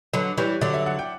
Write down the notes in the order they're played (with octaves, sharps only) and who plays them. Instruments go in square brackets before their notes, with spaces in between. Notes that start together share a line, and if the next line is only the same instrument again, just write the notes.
[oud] D3 F#3 [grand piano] B4
[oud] E3 G3 [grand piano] C#5
[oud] D3 F#3 [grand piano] D5
[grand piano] E5
F#5
G5